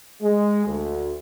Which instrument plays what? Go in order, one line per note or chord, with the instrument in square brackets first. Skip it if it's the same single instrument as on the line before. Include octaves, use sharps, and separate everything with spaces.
[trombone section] G#3
D2